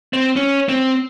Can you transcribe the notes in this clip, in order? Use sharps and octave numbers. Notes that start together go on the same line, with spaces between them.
C4
C#4
C4